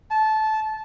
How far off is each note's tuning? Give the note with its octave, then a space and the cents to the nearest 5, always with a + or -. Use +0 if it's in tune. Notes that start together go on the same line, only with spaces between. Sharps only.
A5 -20